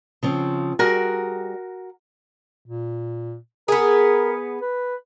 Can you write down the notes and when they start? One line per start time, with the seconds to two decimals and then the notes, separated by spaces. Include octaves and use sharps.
0.23 C#3 F3 C4
0.79 G3 F#4 G#4 A#4
2.67 A#2
3.68 B3 G#4 A#4
4.61 B4